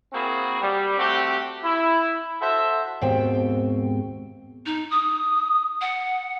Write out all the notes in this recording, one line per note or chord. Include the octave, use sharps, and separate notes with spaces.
A#3 C4 E4 F#4 G#4
G3
A3 C4 F#4 G4
E4
F#4 A4 C5 E5
D#2 G#2 B2 C4 G5
D#4
D#6
F#5